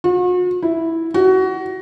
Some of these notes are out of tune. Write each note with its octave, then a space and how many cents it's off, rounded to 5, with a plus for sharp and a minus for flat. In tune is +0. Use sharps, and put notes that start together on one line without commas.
F#4 -45
E4 -5
F#4 +20